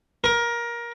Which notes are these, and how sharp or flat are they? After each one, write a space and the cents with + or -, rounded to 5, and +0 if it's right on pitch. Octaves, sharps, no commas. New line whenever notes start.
A#4 +20